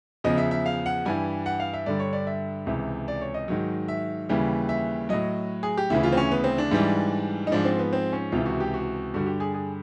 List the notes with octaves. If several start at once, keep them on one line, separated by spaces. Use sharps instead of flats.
E2 C#3 F3 D#5
E5
E5
F5
F#5
G2 E3 G3 G#5
F#5
F5
E5
G2 D3 G3 D5
C#5
D5
E5
C#2 C3 E3
D5
C#5
D#5
G#2 D#3 F#3
E5
D#2 C#3 E3 G3
E5
A2 F#3 D#5
G#4
G4
D2 C#3 E3 E4
F4
C4
C#4
B3
C4
D4
G#2 E3 G3
D#4
G#2 F3 D4
C4
B3
C4
C#4
C#2 C3 E3 F4
F#4
G4
F#4
G2 D3 G3 F#4
G4
G#4
G#4